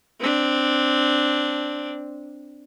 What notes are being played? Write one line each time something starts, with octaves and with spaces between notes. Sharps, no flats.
C4 D4